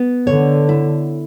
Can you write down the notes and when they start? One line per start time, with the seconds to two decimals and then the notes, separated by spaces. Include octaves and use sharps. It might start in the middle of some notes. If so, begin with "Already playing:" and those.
Already playing: B3
0.27 D3 C#5
0.69 E4